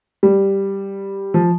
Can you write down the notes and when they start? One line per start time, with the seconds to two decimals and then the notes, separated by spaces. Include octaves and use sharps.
0.23 G3
1.34 F3